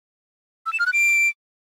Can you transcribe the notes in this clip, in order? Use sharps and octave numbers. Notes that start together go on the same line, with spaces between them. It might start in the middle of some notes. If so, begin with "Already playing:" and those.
E6
E7
F6
F#6
D7